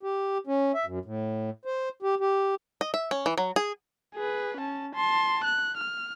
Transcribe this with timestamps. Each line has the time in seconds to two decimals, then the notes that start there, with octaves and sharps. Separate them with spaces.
0.03 G4
0.47 C#4
0.74 E5
0.86 F#2
1.05 A2
1.65 C5
2.03 G4
2.20 G4
2.81 D#5
2.94 E5
3.11 C#4
3.26 E3
3.38 F#3
3.56 G#4
4.15 G#4 B4
4.57 C#4 A5
4.95 A5 C6
5.44 F#6
5.77 F6